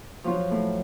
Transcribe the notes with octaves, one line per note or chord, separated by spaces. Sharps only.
F3 F#3 F4
A2